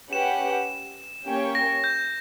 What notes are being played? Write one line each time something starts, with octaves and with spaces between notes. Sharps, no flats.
C#4 G4 B4 F#5 E7
A#3 C#4 G4 C#5 G5
A#6
G6